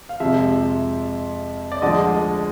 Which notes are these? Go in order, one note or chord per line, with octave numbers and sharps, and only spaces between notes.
F5
F2 C3 F3 G#3 E5
D5
D2 D3 F3 G#3 D#5